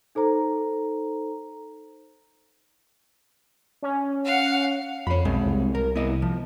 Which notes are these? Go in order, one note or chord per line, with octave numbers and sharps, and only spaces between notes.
D#4 A4 C5 A#5
C#4
F5 F#5
F2 C#5 B5
B1 G#3 C4
C2
A#4
B3 E4 D#5
F3